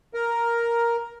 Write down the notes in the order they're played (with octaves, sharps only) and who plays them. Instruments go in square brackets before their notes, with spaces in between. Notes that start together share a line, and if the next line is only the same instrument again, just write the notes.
[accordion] A#4